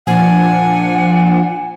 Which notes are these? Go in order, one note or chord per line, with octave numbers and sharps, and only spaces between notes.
A#2 F3 D4 F#5 G#5